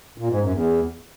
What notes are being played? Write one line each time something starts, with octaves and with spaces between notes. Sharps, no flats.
A#2
G#2
F#2
E2